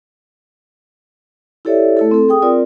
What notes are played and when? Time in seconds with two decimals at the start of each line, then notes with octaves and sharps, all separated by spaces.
1.65 E4 G4 A4 C#5 D5 E5
1.97 A3 E4 A4
2.11 C4 A4
2.29 G#4 G5 D#6
2.42 C4 F4 A#4 D5